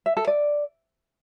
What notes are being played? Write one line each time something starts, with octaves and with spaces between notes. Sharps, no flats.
E5
A4
D5